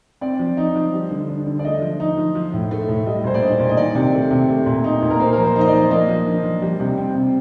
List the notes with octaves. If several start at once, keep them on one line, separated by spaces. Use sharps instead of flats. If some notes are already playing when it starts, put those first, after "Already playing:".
C4 D5
F3
D#4
F3
G3
D3
D4
D3
D5
A3 D#5
F3
D#4
F3
F3
A2
A3
A2
G3 D#5
A#2 C5
D5
D4 D#5
A#2
D#5
D#3 D5
C3
A3
C3
A3
A#2
D#4
A#2
A#4
A#3 C5
A#4
F3
C5
D#4
D#5
D5
F3
A#3 D#5
F3
D4
F3
G3
C3
C4
C3